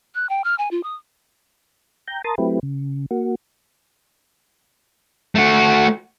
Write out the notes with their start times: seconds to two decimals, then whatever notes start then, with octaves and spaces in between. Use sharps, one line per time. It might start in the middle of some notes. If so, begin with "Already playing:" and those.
0.15 F#6
0.29 G5
0.44 F6
0.58 G#5
0.71 F4
0.83 D#6
2.08 G5 A#5 G6
2.24 A#4 A5 A#5 C6 D#6 A6
2.38 F#3 A3 C4 E4 G4 B4
2.63 C#3
3.11 A#3 F#4
5.35 A3 F#4